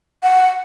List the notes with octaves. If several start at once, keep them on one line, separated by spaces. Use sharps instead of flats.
F#5